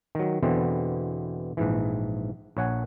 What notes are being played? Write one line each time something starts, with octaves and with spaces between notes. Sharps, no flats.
D#3 F#3
E2 B2 D3 E3 C4
A#1 G#2 E3
A#1 C#5 F#5 G#5